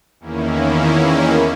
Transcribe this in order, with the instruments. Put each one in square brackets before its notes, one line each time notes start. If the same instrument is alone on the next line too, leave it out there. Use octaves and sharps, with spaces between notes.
[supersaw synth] E2 D#3 A#3 C#4 E4